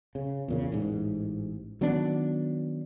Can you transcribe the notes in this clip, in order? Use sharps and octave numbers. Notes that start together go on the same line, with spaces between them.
C#3
E2 A#2 C#3
A1 G#2
D#3 F#3 B3 D4